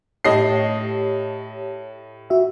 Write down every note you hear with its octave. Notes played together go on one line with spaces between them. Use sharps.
A2 G4 C#5 D#5 A5 C7
F#4 E5